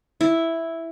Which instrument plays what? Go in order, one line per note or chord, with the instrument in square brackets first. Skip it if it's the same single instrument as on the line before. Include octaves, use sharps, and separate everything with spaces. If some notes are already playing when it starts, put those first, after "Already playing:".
[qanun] E4